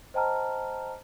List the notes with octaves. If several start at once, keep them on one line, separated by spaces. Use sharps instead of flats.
C5 D#5 G5 A5 A#5 F6